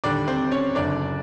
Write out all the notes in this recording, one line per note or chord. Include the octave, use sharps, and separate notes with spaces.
D#2 D3 G3 D4 D5
C4 C5
C#4 C#5
F#1 F#2 D3 D4 D5